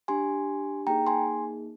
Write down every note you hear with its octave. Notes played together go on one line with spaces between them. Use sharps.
D4 G4 G#5 C6
A#3 D#4 G#4 G5 A#5
G#5 C6